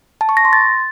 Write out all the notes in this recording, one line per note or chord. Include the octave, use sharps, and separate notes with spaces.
A5
C#6
A#6
C6
A6